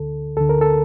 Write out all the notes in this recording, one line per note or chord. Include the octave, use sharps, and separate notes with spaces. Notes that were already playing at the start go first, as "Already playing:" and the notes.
Already playing: D2 D3 A4
D2 D3 A4
A#4
A4